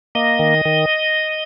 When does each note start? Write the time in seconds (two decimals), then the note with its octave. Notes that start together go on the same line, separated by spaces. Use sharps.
0.15 A#3 D#5
0.39 D#3
0.65 D#3